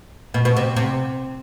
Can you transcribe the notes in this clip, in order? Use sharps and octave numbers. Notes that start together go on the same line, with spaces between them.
B2
B2
C3
C3